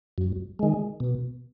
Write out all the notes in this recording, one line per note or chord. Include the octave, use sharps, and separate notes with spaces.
F#2
D#3 G#3
B2